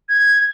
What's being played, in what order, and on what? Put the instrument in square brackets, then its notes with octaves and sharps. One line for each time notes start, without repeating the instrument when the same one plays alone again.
[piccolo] G#6